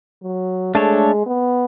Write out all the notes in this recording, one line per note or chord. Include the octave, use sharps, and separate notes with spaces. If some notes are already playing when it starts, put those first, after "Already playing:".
F#3
G#3 A3 D4 A4 C#5
B3